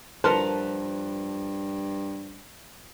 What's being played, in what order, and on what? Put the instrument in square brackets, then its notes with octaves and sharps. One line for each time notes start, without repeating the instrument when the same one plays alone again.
[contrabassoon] G2 [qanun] F3 F#5 A#5 [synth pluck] A#4 [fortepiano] B4 A5 C6